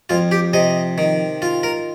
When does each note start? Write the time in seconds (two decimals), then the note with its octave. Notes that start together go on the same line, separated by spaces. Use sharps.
0.10 F2 F4
0.32 G4
0.53 C3 D#5
0.98 D#3
1.42 F4
1.63 A#4